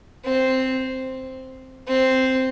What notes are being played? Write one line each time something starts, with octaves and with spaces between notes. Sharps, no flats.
C4
C4